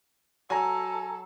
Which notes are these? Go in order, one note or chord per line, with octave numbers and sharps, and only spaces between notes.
F#3 A4 G#5 A#5